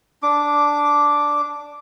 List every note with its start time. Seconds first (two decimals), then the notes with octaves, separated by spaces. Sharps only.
0.23 D4 D6